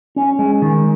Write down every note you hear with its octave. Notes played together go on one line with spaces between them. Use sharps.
C#4
G#3
D#3